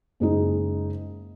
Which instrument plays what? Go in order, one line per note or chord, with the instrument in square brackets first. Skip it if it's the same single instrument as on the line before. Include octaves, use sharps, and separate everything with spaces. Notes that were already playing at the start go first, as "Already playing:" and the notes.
[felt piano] F#1 G#3 D#4